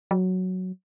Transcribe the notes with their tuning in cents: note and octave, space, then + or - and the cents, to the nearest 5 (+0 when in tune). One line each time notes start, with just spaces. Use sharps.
F#3 +0